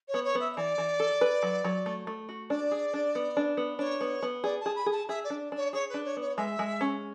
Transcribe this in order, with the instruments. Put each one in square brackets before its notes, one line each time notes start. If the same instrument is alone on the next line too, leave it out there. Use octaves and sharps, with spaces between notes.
[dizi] C#5
[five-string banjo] B3
[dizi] C#5
[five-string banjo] B3
[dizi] E5
E5
[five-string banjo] E3 [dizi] D5
[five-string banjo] E3
A4
B4
F#3
F#3
A3
A3
F#4
[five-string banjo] D4 [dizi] D5
[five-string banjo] G#4
D4
B3
D4
B3
[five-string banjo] D4 [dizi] C#5
[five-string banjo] B3
B3
[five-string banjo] G#4 [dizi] D5
[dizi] A5
[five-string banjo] G#4
[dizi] B5
[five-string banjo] G#4
[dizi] A5
[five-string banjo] G#4 [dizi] E5
[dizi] D5
[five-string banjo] D4
[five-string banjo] D4 [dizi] C#5
[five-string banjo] G#4 [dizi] C#5
[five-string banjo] D4 [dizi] B4
[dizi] C#5
[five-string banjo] B3 [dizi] C#5
[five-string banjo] G#3 [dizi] E5
[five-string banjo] G#3
C#4